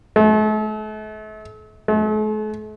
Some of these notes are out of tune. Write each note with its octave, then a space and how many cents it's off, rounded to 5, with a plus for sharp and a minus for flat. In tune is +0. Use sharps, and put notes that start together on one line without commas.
A3 -40
A3 -45